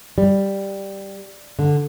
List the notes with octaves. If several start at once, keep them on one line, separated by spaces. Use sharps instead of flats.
G3
D3